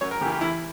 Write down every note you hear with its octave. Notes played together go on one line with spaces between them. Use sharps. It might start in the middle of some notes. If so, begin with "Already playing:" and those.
F#2 C#5
A#4
C#3 E3 G4
G4
E2 E4